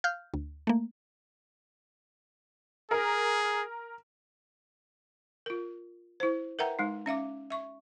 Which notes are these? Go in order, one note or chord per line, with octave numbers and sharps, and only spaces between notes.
F5 F6 G6
D2
A3 A#3
G#4 A#4
F4 A#4
E4 C5
A#4 B4 E5 F#5 G5 A#5
G#3 D#4
C#4 E5 F5 D6
E5 C#6